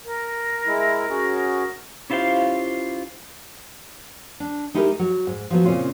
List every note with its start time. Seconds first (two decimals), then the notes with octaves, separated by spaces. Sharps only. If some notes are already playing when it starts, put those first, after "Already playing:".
0.04 A#4
0.67 G#3 E4
1.10 C#4 F#4 G#4
2.10 C#4 E4 F4 G4 C5 F5
4.40 D4
4.74 G#3 D#4 E4 G4 G#4 A#4
4.99 F#3
5.27 G#2
5.50 F3 F#3 B3
5.65 A#2 C#3 C4 C#4 F4